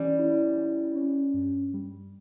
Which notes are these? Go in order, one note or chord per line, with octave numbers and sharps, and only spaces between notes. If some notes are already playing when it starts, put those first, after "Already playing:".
Already playing: E3 G3 C#4
E4
C#4
C#4
G2
G3